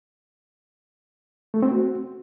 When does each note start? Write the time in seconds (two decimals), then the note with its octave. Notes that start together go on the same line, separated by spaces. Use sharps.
1.54 A3
1.63 C4
1.71 F#4